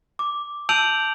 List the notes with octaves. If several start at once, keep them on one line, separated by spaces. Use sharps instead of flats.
D6
A5 E6 G6 D7 F7 F#7